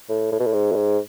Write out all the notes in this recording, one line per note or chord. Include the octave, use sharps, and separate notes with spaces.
A2
A2
B2
A2
G#2
F#2
G#2